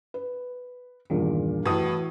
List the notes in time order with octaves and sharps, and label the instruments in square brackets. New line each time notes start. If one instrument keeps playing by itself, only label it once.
[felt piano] B4
[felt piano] E2 G2 A#2 [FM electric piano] D#3
[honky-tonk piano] A2 D#6 [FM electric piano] E3 F#4 [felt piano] B4 A5